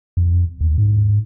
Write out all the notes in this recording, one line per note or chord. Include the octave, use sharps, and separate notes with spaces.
F2
D#2
G#2